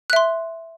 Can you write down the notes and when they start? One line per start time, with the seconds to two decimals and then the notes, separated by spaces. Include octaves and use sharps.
0.10 F#6
0.13 E5
0.16 C6